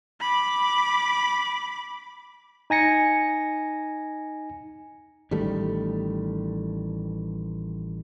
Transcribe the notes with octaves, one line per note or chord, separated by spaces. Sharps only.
B5 D6
D#4 G#5 A#6 C#7
A1 D#3 G3 A3